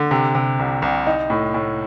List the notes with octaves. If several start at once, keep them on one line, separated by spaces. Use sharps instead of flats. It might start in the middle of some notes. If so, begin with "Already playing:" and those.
Already playing: D3
C3
C3
C2
C2
D#4
A2
A2